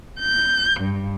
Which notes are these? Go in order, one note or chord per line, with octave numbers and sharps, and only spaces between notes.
G6
G2